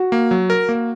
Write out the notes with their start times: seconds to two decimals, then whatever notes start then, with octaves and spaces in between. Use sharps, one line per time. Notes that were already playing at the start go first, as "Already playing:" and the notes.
Already playing: F#4
0.12 A#3
0.31 F#3
0.50 A#4
0.69 A#3